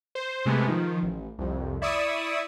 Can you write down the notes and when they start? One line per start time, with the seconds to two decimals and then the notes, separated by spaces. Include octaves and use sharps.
0.15 C5
0.45 C3 G#3 A3 B3
0.68 D#3 F3
1.03 A1
1.39 C2 F2
1.82 E4 D5 C#6 D#6 E6